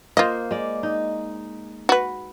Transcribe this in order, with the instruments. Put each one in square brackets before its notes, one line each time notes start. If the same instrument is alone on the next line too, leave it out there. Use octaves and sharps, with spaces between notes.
[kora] A#3 C5 [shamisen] F4 D#5
[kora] G#3 D5
D#4
[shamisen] F#4 B4